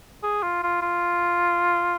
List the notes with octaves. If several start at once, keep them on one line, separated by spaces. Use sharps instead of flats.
G#4
F4
F4
F4